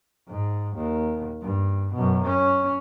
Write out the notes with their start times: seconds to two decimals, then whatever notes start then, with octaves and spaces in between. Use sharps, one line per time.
0.28 G#2
0.76 D#2
1.41 G2
1.94 F#2 B2
2.25 C#4